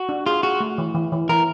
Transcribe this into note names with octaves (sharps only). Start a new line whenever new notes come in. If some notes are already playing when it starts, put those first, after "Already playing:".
Already playing: F#4
D4
F4 G#4
F#4 G#4
A3
E3
E3
E3
E3 A#4